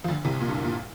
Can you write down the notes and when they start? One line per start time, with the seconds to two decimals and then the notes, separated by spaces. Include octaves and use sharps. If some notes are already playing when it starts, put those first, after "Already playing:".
0.04 F3
0.08 D2 D3
0.25 C2 C3
0.40 A#2
0.49 G2
0.64 A#2